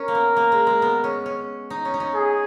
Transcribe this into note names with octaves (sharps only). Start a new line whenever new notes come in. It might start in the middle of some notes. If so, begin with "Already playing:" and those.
Already playing: C#4 A#4
A#3
B3
A#3
G#3
G#3
B3
C#4
C#4
D#4
C#4
D#4
C#4
G#4